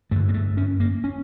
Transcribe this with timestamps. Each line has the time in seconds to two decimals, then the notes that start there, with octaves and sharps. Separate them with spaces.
0.11 G2 A3
0.15 D3
0.29 A#3
0.34 A3
0.57 C#4
0.80 A#3
1.04 C#4